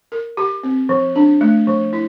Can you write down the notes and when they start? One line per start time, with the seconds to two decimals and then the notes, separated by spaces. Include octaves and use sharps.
0.12 A#4
0.37 G4
0.63 C4
0.89 F3
1.16 D4
1.41 A3
1.67 F3
1.93 E4